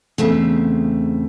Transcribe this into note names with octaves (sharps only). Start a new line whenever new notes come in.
E2 C#3 A3 C4